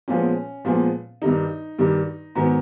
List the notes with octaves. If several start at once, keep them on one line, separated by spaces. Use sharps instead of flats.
A#2 F3 G#3 B3 C#4
A#2 F3 G#3 B3
G2 D#3 G3 D#4
G2 D#3 G3
G#2 D#3 F#3 B3